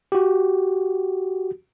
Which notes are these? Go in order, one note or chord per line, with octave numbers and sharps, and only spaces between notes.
F#4 G4